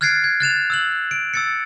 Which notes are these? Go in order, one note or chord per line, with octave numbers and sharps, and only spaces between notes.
F6 F#6 G#6 A6 C7 D7
G#6
F#6 A6 E7 F7
E6 F#6 F#7
D7
E6 A6 C#7